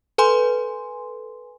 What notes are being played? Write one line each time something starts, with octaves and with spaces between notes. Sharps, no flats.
A4 B4 G#5 C6